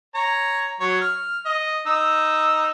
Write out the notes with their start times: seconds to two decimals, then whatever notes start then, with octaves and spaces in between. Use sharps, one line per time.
0.15 C#5 A#5
0.80 F#3 C#5
1.01 F6
1.45 D#5
1.86 D#4 E6